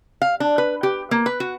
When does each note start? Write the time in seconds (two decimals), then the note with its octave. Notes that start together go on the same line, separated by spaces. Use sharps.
0.22 F5
0.40 D4
0.58 B4
0.83 G4
1.11 A#3
1.26 B4
1.40 F#4